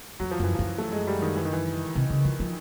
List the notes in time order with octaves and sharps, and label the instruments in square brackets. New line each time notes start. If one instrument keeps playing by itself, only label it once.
[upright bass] F2 [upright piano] F#3
[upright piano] F3
[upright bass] F#2 [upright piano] E3
[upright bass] F#2 [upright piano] F3
[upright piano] A3
G#3
G3
D#3
E3
D#3
E3
[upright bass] C3
C#3
F3
F3